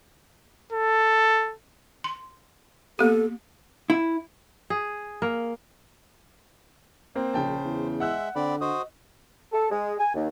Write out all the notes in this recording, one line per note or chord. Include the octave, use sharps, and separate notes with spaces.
A4
C6
A#3 B3 G4 A4
E4
G#4
A#3
A#3 C4 C5
A#1 C#3 G5 A5
E2
G#3 E5 F#5 E6 F#6
D3 C4 D5 B5
F#4 C5 D#5 D#6
A4
G#3
G#5
D#2